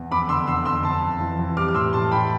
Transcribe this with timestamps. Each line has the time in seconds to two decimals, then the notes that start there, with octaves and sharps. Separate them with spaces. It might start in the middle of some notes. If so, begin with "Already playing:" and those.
Already playing: E2
0.11 F2 B5 D6
0.29 D3 C6 E6
0.47 D3 C6 E6
0.65 F2 C6 E6
0.83 F2 A5 C6
1.02 F2
1.20 E3
1.39 E3
1.56 G3 D6 F6
1.68 F6
1.74 A2 C6 E6
1.93 A2 A5 C6
2.11 G3 G5 B5